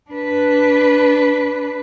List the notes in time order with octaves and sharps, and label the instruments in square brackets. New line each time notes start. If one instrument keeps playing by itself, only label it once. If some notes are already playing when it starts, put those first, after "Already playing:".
[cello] D4 B4